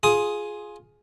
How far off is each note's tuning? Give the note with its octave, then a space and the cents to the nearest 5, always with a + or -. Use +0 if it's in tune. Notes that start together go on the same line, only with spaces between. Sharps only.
F4 +10 G#4 +10 D#6 +5